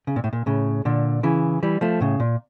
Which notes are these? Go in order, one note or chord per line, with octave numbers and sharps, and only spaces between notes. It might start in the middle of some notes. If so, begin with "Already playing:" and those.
C#3
A#2
A2
A#2
A2 C#3
A#2 D3
C#3 E3
E3 G3
F3 A3
A2 C#3
A#2